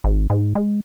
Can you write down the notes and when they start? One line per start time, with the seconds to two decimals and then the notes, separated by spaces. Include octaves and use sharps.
0.04 G#1
0.30 G#2
0.55 G#3